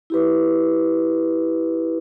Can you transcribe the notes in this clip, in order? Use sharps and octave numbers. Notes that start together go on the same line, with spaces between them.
E4 G4 B4